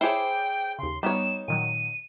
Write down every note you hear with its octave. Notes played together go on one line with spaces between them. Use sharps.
E4 G#4 C5 C#5 G5 D6
D#2 C#3 C6
G3 B3 D#4 C#5 E7
A#2 D#3 F#3 D#7